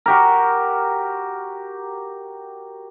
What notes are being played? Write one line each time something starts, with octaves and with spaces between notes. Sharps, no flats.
F#4 G4 A#4